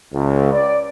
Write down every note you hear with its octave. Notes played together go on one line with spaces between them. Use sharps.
C#2
D5